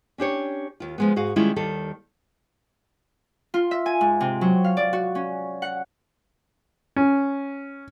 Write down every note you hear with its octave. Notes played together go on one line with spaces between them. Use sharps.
C#4 D4 G4 C#5
D#2 F4
F3 G#3 B3
G#2 F#4 G#4 F5
D#3 G3 G#3 C#4 E4 F4
D#2 D#3 G3 A4
F4
E5
G#5
G#2
C3
F#3
F5
D5
F#4
C#4
F#5
C#4